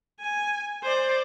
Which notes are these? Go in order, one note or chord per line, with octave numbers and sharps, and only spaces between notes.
G#5
C5 D5